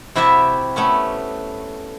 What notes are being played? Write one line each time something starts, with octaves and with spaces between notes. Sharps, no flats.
C3 E4 F#4 G4 E5 A5
A3 B3 C#4